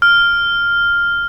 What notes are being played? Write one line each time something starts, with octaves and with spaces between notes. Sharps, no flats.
F6